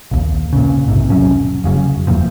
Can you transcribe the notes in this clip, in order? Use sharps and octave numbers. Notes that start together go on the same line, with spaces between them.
A#1 D#2
A#2 C#3
B1 G#2 C3
E1 F#2 F#3 C#4
F1 C#3 F#3
D#1 E2 A#2 F3